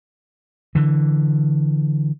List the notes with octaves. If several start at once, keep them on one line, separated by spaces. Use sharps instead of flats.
D3 E3